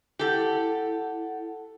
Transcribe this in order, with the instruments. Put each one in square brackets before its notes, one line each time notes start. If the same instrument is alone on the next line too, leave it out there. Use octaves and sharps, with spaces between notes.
[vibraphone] E4 F#5 [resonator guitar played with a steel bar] G4 A4